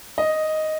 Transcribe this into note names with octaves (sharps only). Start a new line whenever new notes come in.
D#5